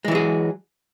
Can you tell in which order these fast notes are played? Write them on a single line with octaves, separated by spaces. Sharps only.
G#3 E3 F#3 G#4